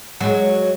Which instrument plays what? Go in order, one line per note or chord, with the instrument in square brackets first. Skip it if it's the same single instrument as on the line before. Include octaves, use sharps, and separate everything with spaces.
[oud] F#3 G#3